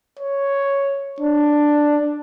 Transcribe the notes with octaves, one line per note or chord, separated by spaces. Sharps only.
C#5
D4